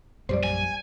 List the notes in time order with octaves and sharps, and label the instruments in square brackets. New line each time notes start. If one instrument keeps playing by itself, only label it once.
[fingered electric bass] A#1 F#2 G3 [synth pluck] C5 D5
[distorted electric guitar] G#5